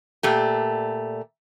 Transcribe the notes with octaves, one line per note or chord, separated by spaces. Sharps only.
A#2 A3 G4